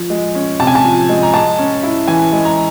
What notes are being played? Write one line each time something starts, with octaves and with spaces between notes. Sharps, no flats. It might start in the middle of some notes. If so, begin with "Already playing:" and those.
Already playing: F3
G#3
C#4
C3 A5
G#5
A5
F3
G#3
A#5
G#3 A5
C#4
E4
E3 G#5
G#3
A#5